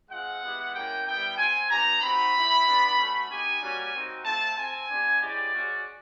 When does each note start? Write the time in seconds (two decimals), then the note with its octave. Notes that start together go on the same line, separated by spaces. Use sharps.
0.10 G#3 C4 F4 F#5
0.43 G#3 B3 E4 G4
0.74 A#3 C#4 E4 G5
1.06 G3 B3 E4 G5
1.38 C4 F4 G#5
1.70 B3 D#4 G4 A#5
2.02 C4 D#4 F#4 B5
2.34 C4 E4 G4
2.66 B3 D4 F4
2.98 A3 C#4 F#4
3.30 A#3 D#4 G4 G#5
3.62 G3 A#3 C#4 F#4
3.94 C4 D#4 F#4
4.26 A3 C4 F4 A5
4.57 C4 F4 G#5
4.90 B3 D4 G4
5.21 G#3 C#4 E4 G4 D5
5.54 G#3 C#4 F#4